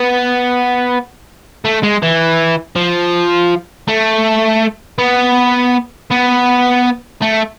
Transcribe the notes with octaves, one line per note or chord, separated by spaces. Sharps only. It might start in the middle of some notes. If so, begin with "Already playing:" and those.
Already playing: B3
A3
G#3
E3
F3
A3
B3
B3
A3